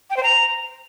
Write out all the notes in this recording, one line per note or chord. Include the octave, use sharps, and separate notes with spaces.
G5
C5
A#5